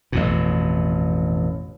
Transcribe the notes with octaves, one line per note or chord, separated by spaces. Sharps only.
A1 F2 B2